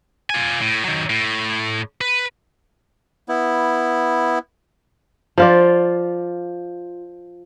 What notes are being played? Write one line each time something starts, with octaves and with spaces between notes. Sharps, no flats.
F4 G#5
A2
D#3 F#3
A2
B4
B3 E4
F3 F4 D5